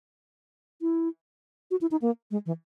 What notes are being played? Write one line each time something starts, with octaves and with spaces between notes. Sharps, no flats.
E4
F#4
E4
D#4
A#3
G#3
E3